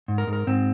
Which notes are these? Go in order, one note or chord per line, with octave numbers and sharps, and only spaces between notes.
G#2
A#4
G#2
A#4
G#2 C4